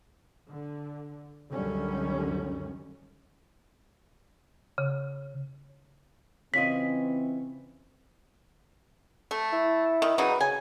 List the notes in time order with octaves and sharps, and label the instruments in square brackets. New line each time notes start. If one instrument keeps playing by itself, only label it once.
[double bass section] D3
C#2 F#2 D3 D#3 G3 C#4
[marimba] C#3
[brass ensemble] C#3 E3 C4 [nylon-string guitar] C#4 F4 D#5 [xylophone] B6
[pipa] A3
[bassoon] E4
[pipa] D#3
[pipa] C#3 F#3 D#4 [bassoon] B4
[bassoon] C#3 [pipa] G#5